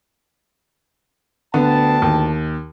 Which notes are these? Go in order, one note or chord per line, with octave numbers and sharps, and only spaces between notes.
D2 D3 B3 G5 A5
D#2